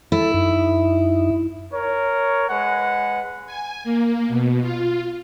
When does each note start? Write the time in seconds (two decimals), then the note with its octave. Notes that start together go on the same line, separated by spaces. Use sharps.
0.12 E4 A4
0.34 F#2 D#4
1.73 A#4 C#5
2.49 G#3 B4 F#5
3.46 G#5
3.84 A#3
4.28 B2
4.61 F4